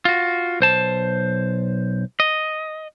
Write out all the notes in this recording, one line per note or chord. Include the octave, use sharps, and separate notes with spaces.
F4 F#4
B1 C5 A5
D#5